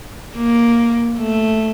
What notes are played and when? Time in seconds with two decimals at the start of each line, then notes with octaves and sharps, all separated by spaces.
0.36 A#3
1.20 A3